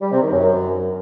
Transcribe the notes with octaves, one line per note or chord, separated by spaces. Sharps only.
G3
C3
D#3
F#2